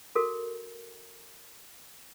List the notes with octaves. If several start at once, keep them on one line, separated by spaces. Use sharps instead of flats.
F#4 A4 A#4